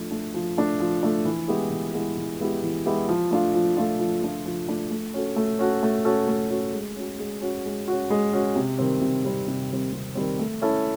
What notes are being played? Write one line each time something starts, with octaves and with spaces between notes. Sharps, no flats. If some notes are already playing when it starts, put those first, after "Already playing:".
Already playing: F3 A3 D4
A3 D4
F3
A3 D4
F3
A3 D4
E3
G#3 B3 E4 G4
E3
G#3 B3 E4 G4
E3
G#3 B3 E4 G4
E3
G#3 B3 E4 G4
F3
A3 D4 F4
F3
A3 D4 F4
F3
A3 D4 F4
F3
A3 D4 F4
A3
C#4 F#4 A4
A3
C#4 F#4 A4
A3
C#4 F#4 A4
A3
C#4 F#4 A4
G#3
C#4 F#4
G#3
C#4 F#4
G#3
C#4 F#4
G#3
C#4 F#4
C3
D#3 G3 C4
C3
D#3 G3 C4
C3
D#3 G3 C4
C3
D#3 G3 C4
A3
C#4 E4 A4